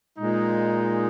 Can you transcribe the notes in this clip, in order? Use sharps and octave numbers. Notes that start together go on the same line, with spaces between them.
A#2 G#3 D#4